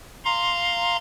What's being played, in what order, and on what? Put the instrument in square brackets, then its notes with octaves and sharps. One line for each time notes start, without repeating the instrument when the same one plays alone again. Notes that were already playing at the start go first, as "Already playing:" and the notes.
[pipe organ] F5 A#5 C6